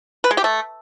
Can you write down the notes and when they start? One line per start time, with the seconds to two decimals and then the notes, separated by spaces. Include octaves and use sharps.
0.24 B4
0.31 G#3
0.37 G4
0.44 A3